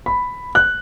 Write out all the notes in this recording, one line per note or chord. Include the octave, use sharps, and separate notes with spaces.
B5
F#6